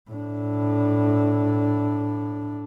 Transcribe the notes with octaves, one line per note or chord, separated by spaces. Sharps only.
A2 D4